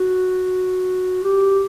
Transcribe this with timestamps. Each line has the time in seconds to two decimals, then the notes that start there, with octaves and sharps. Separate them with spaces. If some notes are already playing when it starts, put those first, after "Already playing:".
Already playing: F#4
1.23 G4